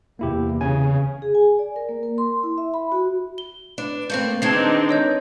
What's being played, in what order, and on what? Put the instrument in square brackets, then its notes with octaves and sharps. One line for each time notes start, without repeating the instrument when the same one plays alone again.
[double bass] E2 C3 [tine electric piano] A#3 E4 G4
[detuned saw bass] C#3 [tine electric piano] G#5
[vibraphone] G#4
G#5
D5
A#4
A#3
A#4
C6
E4
E5
B5
F#4
[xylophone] G7
[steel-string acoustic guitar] D4 [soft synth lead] B4
[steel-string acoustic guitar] A3 A#3 C4 [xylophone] G6
[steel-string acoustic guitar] D#3 G#3 [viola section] C4 D4 D#4 [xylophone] A5 G#6 C7
[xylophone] C#5 D#5 G6